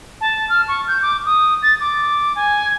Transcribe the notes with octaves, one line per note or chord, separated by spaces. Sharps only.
A5
F6
C#6
G6
D6
D#6
A6
D6
G#5